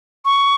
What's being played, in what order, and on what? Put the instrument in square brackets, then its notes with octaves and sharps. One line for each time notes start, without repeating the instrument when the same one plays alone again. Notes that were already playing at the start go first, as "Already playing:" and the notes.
[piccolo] C#6